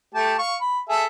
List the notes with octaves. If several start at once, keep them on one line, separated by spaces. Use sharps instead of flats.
A3 G4 A5
F5 C#6
B5
G#4 A4 E5